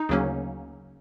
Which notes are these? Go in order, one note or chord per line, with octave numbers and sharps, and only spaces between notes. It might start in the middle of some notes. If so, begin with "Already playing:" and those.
Already playing: D#4
D2 C#3 F#3 A#3 C#4